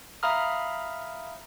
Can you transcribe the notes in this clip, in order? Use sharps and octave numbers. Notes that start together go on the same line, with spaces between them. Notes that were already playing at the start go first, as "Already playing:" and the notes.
E5 F5 A#5 B5 D#6 F6